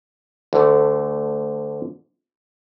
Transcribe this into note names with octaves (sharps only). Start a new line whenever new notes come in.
D2 D3 A3